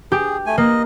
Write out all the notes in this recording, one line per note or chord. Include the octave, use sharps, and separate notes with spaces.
G4 G#4
A3 G#5
A#3 D#5